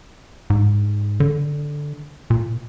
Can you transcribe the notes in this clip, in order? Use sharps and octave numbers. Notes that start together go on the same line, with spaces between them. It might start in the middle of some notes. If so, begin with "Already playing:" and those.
G#2
D3
A#2